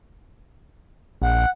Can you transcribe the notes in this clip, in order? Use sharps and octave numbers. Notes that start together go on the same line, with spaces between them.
A#1 F#5